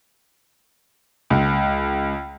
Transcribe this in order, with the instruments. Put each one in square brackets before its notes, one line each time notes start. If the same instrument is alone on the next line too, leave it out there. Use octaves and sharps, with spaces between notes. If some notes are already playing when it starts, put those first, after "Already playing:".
[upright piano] C#2